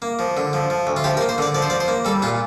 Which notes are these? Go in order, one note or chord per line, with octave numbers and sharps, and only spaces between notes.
A#3
F3
D3
F3
F3
D2
F4
F3 G4
A#4
A#3
C5
D3 D5
F3 D5
C5
F3 D5
C5
A#3
G3 A4
A#2 F4